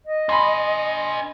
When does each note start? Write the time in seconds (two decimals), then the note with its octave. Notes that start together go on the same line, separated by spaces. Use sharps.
0.06 D#5
0.29 D4 G#5 B5 C6